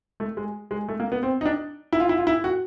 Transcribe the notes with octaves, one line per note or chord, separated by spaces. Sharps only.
A3
G#3
G#3
A3
A#3
B3
C4
D#4
D4
E4
F4
E4
F4
E4
F#4